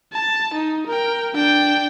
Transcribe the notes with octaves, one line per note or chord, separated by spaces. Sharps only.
A5
D#4
A#4 G5
D4 G5